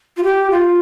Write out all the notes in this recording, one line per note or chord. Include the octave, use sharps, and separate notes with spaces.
F4
G4
F4